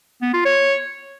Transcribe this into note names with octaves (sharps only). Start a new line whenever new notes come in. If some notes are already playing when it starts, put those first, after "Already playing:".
B3
F4
C#5